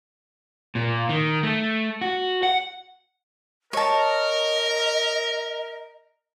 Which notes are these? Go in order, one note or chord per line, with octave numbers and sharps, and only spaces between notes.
A#2
D#3
A3
F#4
F#5
A#4 C#5 D#5 A5